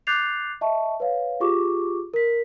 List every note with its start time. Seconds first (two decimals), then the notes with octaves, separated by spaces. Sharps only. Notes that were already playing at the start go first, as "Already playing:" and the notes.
0.07 D6 F#6 G6 A6 C7 F7
0.61 D#5 E5 A5 C#6
1.00 B4 C#5 F5
1.40 F4 G4 G#4 C#6 D6
2.14 A#4 B6